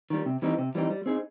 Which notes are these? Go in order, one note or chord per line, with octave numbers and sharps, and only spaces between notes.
D#3 G3
C3
E3 G3 C4 D#4
C3
E3 G3 C4 D#4
G3
C4 D#4 G#4